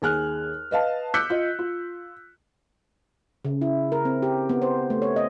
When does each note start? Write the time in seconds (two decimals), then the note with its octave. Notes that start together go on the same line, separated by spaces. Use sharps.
0.02 D#2 G#4 G#5 F6 F#6
0.71 B4 D#5 F5 A5
1.14 D6 E6 F#6 G6 B6 C#7
1.30 F4 D#5
1.59 F4
3.45 C#3
3.61 E4
3.92 A#4
4.05 C4
4.22 G4
4.49 B3
4.62 C5
4.90 A3
5.02 C#5
5.16 D#5